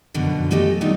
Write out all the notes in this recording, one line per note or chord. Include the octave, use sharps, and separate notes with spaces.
F#2 B2 D3 F3
G#3 A3 G4 A4 D#5
F#3 G3 B3 D#4 F4 G4